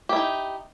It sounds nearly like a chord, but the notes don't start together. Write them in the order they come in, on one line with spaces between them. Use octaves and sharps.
G4 E4 D#4